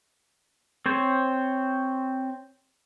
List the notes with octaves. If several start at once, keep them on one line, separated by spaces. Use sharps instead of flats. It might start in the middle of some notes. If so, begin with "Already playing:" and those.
C4 C5 C#5